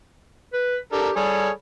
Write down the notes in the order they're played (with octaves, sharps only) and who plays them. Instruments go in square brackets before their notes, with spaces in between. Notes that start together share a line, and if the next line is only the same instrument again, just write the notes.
[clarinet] B4
[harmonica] D4 A4 A#4 [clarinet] G4
[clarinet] G3 [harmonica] G#4 A4 C#5